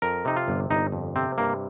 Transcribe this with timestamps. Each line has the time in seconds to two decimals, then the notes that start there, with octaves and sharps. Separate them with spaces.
0.02 F2 A#4
0.25 C3 D#4
0.36 F4
0.48 G1
0.70 G1 D#4
0.92 F2
1.16 C3 C4
1.38 G2 A#3